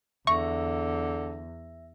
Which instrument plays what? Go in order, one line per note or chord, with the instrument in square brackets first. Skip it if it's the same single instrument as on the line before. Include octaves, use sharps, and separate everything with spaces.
[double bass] E2 [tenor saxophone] D3 [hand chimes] E5 [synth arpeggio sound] C#6